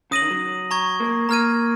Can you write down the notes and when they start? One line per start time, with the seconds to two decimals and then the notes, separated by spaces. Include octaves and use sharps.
0.11 C#3 D#6 A#6 D#7 F#7
0.21 D#3
0.31 F#3
0.71 A#5 C#6 G#6
1.00 A#3
1.29 A#3 A#5 F6 G#6 D#7